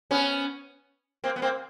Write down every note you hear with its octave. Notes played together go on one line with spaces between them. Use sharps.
B3 C#4
A#3 C4
B3
A#3 C4